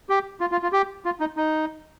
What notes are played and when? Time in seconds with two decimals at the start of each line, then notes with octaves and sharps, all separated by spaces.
0.09 G4
0.41 F4
0.52 F4
0.63 F4
0.72 G4
1.05 F4
1.20 D#4
1.37 D#4